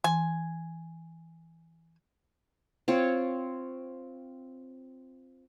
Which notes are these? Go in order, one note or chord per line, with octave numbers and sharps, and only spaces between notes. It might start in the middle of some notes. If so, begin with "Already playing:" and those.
E3 G#5
C4 F4 C#5